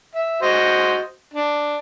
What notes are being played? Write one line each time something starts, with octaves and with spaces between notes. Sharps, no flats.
E5
F#4 C5 D#5
D4